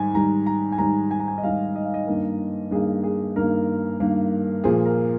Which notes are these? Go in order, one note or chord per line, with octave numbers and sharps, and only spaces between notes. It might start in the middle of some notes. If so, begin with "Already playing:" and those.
Already playing: G#2 D#3 G3 G#5
G#2 D#3 G3 A#5
A#5
G#5
G#2 D#3 G3 A#5
G#5
A#5
G#5
D#5
G#2 D#3 G3 F5
D#5
F5
D#5
G2 D#3 A#3
G2 D#3 A#3 G#4
G#4
G2 D#3 A#3 A#4
G2 D#3 A#3
A#2 F3 A#3 G#4
A#4